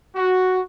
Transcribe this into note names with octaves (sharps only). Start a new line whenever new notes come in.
F#4